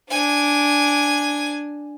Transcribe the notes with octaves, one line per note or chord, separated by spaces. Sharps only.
D4 G#5